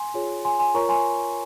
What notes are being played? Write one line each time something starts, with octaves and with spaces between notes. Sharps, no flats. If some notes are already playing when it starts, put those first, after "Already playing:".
Already playing: G#5 C6
F4 G#4 C#5
G#5 C6
G#5 C6
F4 A#4 C#5 A#5 C#6
G#5 C6